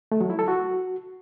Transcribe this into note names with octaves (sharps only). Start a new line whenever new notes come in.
A3
F#3
E4
A4
F#4